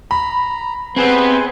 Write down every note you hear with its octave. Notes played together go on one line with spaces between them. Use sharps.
A#5 B5
E2 C3 B3 C4 G#4 B4 G#5